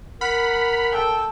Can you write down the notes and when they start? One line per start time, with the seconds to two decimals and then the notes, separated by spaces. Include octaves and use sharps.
0.21 A#4 F#5 B5 F6
0.92 A4 G5